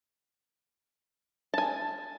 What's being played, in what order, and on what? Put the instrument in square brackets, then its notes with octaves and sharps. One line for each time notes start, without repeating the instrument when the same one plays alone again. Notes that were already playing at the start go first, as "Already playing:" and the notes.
[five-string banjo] G#5 A5